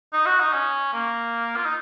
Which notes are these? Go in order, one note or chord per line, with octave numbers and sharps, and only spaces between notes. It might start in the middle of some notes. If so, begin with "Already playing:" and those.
D#4
F#4
D#4
C#4
A#3
F4
D#4